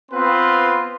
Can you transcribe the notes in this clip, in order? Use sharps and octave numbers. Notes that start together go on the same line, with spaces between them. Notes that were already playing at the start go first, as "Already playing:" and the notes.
B3 C4 F4 B4 B5 C6